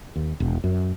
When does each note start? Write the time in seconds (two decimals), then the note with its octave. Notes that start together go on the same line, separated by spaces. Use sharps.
0.16 D#2
0.40 E1
0.64 F#2